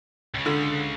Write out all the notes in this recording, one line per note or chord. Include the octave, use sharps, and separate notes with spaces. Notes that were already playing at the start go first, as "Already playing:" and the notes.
C#2 C#3
D3